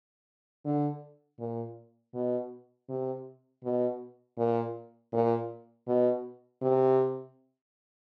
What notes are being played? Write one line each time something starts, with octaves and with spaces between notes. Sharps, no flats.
D3
A#2
B2
C3
B2
A#2
A#2
B2
C3